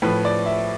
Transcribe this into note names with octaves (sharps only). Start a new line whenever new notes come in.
A2 F3 B4
D5
E5